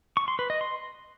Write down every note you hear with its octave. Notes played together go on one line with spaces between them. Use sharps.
C#6
C6
B4
D#5
C6